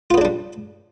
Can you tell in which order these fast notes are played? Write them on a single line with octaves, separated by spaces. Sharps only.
F4 B3 C#3 D4 G3